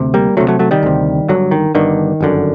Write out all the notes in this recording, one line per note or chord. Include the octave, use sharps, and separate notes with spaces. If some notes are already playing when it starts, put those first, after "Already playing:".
Already playing: D2 C3
G3 A#3
D2 C3 F#3 A3
F#3 A3
F#3 A3
D#3 G3
D2 C3
G1 G2 D3 F#3
D#3
G1 G2 D3 D#3
G1 F#2 D3